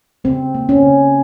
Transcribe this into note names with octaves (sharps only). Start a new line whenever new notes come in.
C#3 C4
A#3
C#4
C#3